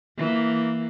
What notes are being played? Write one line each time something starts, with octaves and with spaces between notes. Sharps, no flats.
E3 A#3